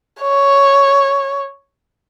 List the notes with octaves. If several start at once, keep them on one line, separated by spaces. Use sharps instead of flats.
C#5